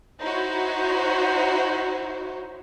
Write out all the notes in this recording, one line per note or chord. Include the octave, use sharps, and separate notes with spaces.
D#4 E4 F#4 C5 C#5